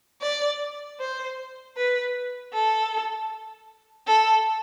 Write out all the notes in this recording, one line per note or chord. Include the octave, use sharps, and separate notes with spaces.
D5
C5
B4
A4
A4